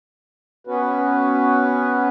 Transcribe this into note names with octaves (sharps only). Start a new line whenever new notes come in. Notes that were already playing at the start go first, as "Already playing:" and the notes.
B3 C#4 F#4 B4